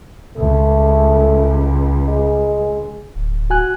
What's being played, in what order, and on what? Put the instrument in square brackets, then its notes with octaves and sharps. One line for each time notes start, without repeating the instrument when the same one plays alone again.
[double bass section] C#2 [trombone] A3
[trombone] G#3
[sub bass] D1
[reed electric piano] F#4 G#5 F#6